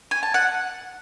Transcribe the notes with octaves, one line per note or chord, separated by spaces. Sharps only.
G#5
A5
F#5